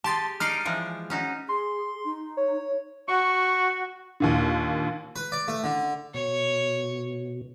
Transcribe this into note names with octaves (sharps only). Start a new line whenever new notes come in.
G4 G#4 A5 C6 A6
D#4 D5 D#5 F6 C7 D7
E3 F3 G#3
C#4 D#4 F#4
G#4 C6
D#4
C#5
F#4 C#6
D#2 A#2 D3
B4
D5
A3
D3
B2 C#5